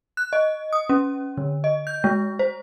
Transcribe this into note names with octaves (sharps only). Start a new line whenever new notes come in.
F#6
D#5
D#6
C#4
D3
D#5
G6
G#3
C5